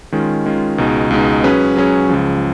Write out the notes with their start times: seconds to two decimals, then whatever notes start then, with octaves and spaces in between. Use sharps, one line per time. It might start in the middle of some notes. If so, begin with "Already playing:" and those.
0.12 D#3 G#3 C#4 F4
0.46 D#3 G#3 C#4 F4
0.78 C#2 B2 G#3 D#4
1.11 C#2 B2 G#3 D#4
1.44 F#3 C#4 G#4 B4
1.77 F#3 C#4 G#4 B4
2.09 C#2 C#3 F3